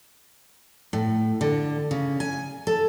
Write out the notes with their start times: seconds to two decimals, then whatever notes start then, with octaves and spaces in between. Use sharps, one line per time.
0.93 A2
1.41 D3
1.91 C#3
2.20 G#5
2.67 A4